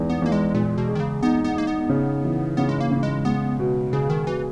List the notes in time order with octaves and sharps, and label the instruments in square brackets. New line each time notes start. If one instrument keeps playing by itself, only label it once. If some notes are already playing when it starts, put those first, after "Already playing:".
Already playing: [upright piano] E2 G#3 D#4
[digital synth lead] B3
[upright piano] E2 [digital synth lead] A#3
[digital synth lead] G#3
[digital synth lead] A#2 [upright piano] G#3
[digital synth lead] B2
[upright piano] G#4
[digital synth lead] D#3
C#3
[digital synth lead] B3 [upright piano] D#4
[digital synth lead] B3
[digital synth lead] A#3 [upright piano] D#4
[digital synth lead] B3
[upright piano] C#3
E3
[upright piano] C#3 [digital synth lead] B3
[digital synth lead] G#3
A#3
[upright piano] C#3
[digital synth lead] G#3
[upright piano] G#3 [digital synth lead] B3
[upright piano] B2
[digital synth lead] C#3 [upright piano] G#4
[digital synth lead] D#3
[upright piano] B2 [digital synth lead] E3